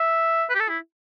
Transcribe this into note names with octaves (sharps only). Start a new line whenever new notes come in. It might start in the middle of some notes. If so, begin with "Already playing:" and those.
Already playing: E5
B4
G4
A4
E4